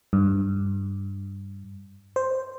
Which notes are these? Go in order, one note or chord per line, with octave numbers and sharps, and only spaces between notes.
G2
C5